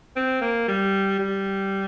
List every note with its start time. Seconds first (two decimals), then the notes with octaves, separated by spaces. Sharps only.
0.16 C4
0.41 A#3
0.68 G3
1.19 G3